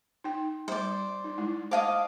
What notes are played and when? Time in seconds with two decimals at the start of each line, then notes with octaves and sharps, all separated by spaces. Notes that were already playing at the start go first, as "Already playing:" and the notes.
0.24 D#4 G5
0.68 G3 C5 D5
1.24 D#4
1.38 G#3 E4
1.71 C5 D#5 F5 F#5 A5 D6